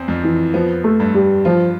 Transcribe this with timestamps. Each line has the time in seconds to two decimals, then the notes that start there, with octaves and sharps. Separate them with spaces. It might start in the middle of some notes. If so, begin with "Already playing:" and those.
Already playing: E2 C4
0.08 F2
0.24 E3
0.54 F3 B3
0.84 A3
1.00 G2
1.14 G3
1.45 F3 F4